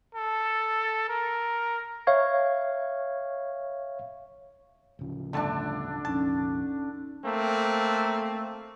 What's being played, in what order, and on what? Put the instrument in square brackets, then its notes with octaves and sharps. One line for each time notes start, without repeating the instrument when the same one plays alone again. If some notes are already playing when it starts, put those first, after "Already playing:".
[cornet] A4
A#4
[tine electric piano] C#5 E5 F5 C#6 G#6
[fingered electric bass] D1 C#3 F3
[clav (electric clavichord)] G1 A3 A5 [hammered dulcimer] D3 D4
[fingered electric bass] F1 A#1 F2 [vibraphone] C#4 D#4 [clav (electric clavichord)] A5
[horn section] A3 A#3 C4